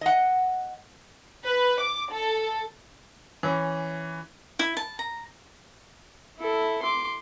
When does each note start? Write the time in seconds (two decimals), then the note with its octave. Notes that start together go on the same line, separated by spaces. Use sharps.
0.01 D#5 F#5
1.46 B4
1.81 D6
2.11 A4
3.43 E3 C#4
4.59 E4
4.77 A5
4.99 A#5
6.39 E4 A4
6.83 C6 D6